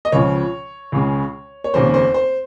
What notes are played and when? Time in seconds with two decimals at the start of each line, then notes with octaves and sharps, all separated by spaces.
0.05 D#5
0.12 C#2 C#3 F3 C#5
0.92 C#2 C#3 G#3
1.64 C#5
1.74 F1 D#2 C#3 C5
1.94 C5
2.14 C5